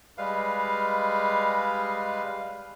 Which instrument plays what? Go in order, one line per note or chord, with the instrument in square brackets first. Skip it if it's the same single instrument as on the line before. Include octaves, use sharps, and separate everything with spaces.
[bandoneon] G3 G#3 B4 F5